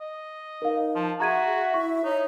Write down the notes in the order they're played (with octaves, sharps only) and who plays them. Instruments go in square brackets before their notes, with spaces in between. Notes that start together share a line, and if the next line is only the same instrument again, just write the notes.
[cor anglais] D#5
[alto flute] D#4 [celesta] A#4 F5
[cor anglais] F3 [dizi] A5
[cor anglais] F#4 [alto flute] G#4 [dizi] E5 [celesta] A#5 G#6 D#7
[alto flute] E4 [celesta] C#6
[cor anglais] D#4 [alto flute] C#5